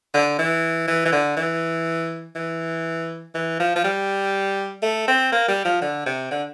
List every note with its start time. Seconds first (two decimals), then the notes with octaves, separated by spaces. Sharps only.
0.14 D3
0.39 E3
0.88 E3
1.05 E3
1.12 D3
1.37 E3
2.36 E3
3.35 E3
3.60 F3
3.76 F3
3.84 G3
4.83 A3
5.08 C4
5.32 A#3
5.48 G3
5.65 F3
5.82 D3
6.06 C3
6.31 D3